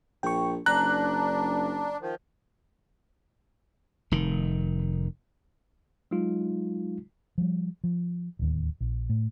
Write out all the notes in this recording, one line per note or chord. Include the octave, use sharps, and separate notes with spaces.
A#1 G5 C#6
F#1 D4 A#5 F#6
D#3 F3
F1 D#3
F#3 G#3 D#4 F4
F3 G3
F3
D1 D#2
A#1
A2